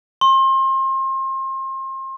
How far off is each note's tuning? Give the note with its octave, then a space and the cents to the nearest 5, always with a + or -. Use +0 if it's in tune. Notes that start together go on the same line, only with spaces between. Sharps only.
C6 +35